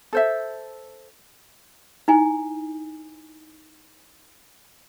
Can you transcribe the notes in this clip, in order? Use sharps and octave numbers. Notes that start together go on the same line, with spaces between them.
A4 C5 E5
D#4 E4 G#5